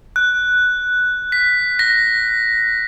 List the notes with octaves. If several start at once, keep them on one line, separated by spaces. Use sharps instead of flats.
F#6
B6
A#6